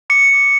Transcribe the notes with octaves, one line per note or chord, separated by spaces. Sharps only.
D6 C#7